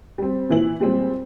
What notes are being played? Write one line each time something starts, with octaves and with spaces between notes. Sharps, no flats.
G3 C4
A#2 E3 E4 F#7
A#2 G3 G#3 C4